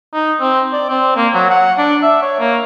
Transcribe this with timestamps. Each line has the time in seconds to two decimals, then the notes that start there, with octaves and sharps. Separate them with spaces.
0.14 D#4
0.41 C4
0.73 D5
0.89 C4
1.16 A#3
1.34 F#3
1.50 F#5
1.78 D4
2.03 E5
2.22 C#5
2.40 A#3